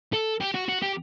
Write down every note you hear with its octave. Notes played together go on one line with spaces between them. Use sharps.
A4
G4
F#4
F#4
G4